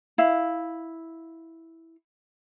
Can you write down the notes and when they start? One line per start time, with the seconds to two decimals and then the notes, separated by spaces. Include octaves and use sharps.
0.18 E4 F5